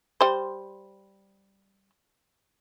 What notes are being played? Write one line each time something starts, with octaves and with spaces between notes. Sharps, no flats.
G3 C5